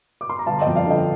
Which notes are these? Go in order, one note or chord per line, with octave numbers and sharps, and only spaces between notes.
D6
C6
A#5
G1 F5 A5
D#5 G5
F2
D5 F5
D3 D#5 G5